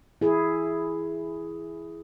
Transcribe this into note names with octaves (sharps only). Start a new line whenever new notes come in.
E4 G#4